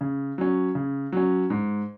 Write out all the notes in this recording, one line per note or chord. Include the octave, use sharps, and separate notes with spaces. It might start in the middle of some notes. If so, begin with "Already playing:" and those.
C#3
F#3 C#4
C#3
F#3 C#4
G#2